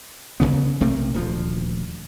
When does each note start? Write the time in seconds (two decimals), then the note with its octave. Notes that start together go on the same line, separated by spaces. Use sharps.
0.40 F#1 D#2 C#3 B3
0.80 B1 C3 A3 A#3
1.14 D#1 D2 F3